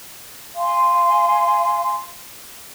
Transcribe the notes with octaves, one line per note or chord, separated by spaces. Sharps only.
F5 G#5 C6